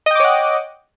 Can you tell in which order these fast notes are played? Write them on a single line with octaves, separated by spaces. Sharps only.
D#5 G5 D6 C#5 F#5